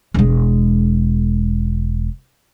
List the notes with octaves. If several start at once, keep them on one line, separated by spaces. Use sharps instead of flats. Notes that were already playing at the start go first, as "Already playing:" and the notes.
E1 G#3